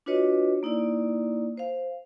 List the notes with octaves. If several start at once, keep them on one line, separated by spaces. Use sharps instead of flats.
D4 F4 F#4 B4 C#5 D#5
A#3 D#4 E4 D5
C5 F5